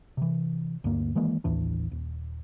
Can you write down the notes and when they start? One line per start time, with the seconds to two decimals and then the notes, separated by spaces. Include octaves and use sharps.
0.17 C3 E3
0.84 D2 G2 A#3
1.15 D#3 E3 G#3 A#3
1.44 A1 D#2 E3 D4
1.92 D#1